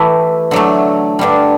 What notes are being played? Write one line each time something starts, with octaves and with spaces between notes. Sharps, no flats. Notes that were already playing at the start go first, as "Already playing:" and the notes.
Already playing: E3 A3 E4 G4
D3 F#3 A3
G2 D3 G3